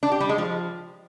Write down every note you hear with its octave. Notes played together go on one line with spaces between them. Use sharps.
D4
G4
G3
G#3
F3